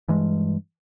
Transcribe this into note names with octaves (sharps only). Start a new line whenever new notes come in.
G2 E3 G#3